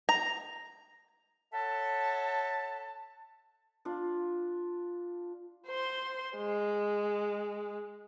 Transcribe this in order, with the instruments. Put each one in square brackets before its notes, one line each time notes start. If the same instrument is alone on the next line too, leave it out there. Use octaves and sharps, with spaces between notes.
[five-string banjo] A#5
[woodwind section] A4 C#5 E5 F#5 A5
[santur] D4 F4
[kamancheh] C5 C6
G#3